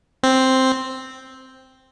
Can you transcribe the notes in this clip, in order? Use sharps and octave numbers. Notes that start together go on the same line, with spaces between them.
C4